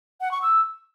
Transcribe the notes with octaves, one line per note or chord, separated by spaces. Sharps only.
F#5
C#6
E6